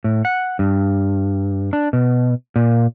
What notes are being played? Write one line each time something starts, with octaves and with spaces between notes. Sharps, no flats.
A2
F#5
G2
D4
B2
A#2